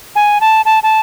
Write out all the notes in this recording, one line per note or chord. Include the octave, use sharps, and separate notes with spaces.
G#5
A5
A5
A5